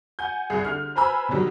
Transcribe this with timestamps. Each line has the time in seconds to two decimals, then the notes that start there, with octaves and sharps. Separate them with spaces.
0.19 F#5 G#5 G6
0.50 C2 G#4 F#6
0.65 D3 F6
0.96 B4 C5 G#5 A#5 B5 E6
1.29 B2 D3 D#3 F#3 G3